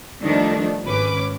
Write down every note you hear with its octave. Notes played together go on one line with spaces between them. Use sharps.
D#3 F3 G3 A3 D4
G#1 C#4 B4 D6